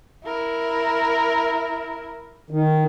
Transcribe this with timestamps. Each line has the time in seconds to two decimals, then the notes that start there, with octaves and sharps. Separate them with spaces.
0.24 E4 A#4
2.51 D#3